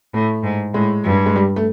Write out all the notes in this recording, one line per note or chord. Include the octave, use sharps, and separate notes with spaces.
A2 A3
G#2
A2 G#3
G2
G#3
G3
A3